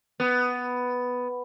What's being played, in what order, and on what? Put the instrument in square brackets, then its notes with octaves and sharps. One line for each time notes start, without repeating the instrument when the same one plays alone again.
[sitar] B3